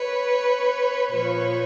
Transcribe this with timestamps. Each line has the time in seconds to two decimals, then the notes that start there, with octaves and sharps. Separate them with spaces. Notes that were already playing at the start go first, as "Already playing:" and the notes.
Already playing: B4 C#5
1.11 A#2 F3 B4 C#5